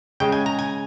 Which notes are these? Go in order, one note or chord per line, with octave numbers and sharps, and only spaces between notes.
C#3 G#3 G5
G#5
A#5
G#5